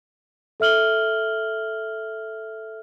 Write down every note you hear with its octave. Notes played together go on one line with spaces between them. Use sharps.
A4 E5 F6 F#7 G7